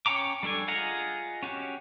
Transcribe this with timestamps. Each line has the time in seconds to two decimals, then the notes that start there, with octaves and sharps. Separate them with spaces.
0.06 C#4 C#5 G5 A#5 D6
0.43 G3 D4 A4 G#5
0.68 F4 G#4 D#5 F#5 A#5
1.43 C#4 F#4 G4